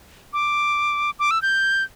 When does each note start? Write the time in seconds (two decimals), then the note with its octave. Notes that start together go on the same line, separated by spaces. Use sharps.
0.33 D6
1.19 D6
1.31 E6
1.42 G6